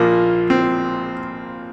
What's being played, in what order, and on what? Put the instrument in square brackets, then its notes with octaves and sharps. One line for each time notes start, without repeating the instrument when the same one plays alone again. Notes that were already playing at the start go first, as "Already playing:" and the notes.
Already playing: [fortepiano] A#1 A#2 F3 A#3
C4